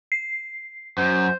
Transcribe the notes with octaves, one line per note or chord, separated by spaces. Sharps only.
C7
F#2 C5